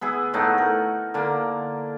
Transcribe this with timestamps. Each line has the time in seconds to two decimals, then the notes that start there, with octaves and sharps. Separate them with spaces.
0.01 B3 E4 G#4
0.34 A2 A3 D#4 F#5
0.58 A#4
1.14 D3 A#3